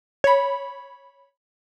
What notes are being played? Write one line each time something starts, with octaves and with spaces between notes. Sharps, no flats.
C#5 B5